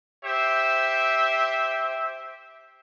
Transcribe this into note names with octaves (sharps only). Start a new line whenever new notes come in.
G4 C5 E5